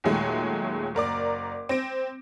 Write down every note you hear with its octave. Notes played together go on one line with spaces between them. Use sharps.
D#2 A#2 D#3 F#3 G#3 A3
F#1 A#4 D5 D6
C4 A#6 D7